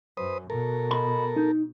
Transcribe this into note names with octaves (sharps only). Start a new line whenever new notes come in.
F#2 B4 C5 D#6
B2 A4 A#4
D#5 B5
D#4